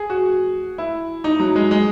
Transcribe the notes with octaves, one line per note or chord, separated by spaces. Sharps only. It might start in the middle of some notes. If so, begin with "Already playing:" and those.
Already playing: G#4
F#4
E4
D#4
F#3
G#3
G#3